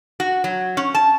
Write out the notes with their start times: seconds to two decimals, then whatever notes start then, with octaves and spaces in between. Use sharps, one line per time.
0.20 F#4
0.44 F#3
0.77 C#4
0.95 A5